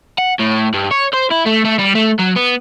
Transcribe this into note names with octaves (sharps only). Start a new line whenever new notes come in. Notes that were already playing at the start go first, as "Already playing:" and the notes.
F#5
A2
G2
C#5
C5
E4
A3
A3
G3
A3
F#3
B3